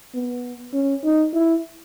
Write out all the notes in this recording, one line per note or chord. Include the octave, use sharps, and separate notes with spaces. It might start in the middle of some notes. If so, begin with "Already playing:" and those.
B3
C#4
D#4
E4